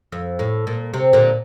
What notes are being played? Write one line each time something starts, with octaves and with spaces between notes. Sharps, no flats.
F2
A2
A#2
C3
A#2 D3